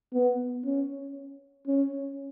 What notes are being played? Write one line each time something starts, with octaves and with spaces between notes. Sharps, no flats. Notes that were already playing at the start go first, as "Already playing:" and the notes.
B3
C#4
C#4